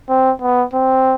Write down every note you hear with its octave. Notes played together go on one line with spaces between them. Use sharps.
C4
B3
C4